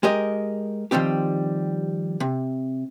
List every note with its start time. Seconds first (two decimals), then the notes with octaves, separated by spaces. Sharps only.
0.03 G#3 G4 A#4 D#5
0.91 D#3 F3 G3 C4 G4
2.20 C3